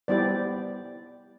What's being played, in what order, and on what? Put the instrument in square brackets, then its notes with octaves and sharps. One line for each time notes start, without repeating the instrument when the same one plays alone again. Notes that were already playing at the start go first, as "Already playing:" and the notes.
[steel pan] G3 B3 E4 G4 C5 D5